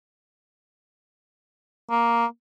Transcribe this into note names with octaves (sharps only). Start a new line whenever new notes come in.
A#3